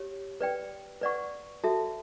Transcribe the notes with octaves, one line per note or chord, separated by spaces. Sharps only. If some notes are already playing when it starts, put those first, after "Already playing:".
Already playing: G4 C#5
B4 D5 G5
B4 D5 F#5 C#6
F#4 A4 E5 A5